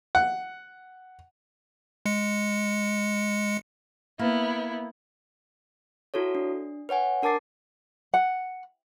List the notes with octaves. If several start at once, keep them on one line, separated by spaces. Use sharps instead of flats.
F#5
G#3 C#7
A#3 B3 E4
E4 F#4 A4 C#5
D4
B4 C#5 F#5 G#5
D4 A#4 A5 D6 A6 C7
F#5